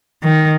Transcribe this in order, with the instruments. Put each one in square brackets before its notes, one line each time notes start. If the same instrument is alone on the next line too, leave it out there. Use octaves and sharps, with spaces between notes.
[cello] D#3